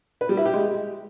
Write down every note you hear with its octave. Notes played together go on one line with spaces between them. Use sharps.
B4
G3
E4
G4
G#3